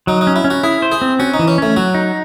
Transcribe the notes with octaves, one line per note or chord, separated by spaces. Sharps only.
F#3 D#4
D#4
C#4
E4
C#4
F#4
E4 G#4
C5
G#4
C4
C#4 F#4
D#4
E3
C#4
A3 C#4
F#3 F#4
D#4